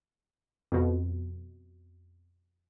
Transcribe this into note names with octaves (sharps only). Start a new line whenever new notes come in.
F2 B2